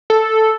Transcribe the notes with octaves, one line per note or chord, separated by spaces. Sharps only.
A4